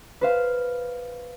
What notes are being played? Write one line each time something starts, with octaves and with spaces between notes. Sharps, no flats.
B4 C5 F5